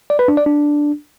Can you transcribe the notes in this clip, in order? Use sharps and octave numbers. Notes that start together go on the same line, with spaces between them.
D5
B4
D4
D5
D4